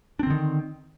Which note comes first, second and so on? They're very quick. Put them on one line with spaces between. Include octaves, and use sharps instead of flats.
D4 C4 D3 D#3